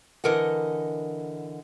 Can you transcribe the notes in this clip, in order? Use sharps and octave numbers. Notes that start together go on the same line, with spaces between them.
D3 E3 A#4 D#5 F#5